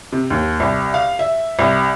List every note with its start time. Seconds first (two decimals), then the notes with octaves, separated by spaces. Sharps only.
0.12 C3
0.30 D#2
0.60 C2
0.94 F5
1.19 E5
1.59 C2